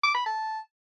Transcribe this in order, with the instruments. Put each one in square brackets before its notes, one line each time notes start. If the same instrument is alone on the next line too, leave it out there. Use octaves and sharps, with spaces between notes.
[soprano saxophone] D6
B5
A5